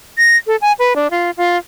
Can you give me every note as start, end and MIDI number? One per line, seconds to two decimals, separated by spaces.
0.18 0.37 94
0.47 0.56 69
0.61 0.72 80
0.79 0.93 71
0.96 1.07 62
1.11 1.31 65
1.37 1.57 65